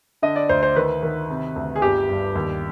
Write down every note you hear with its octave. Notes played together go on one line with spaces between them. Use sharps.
D3 D#5
D5
D2 C5
C5
D#3 B4
D#3
C3
D2
G#4
G1 G4
G2
D#2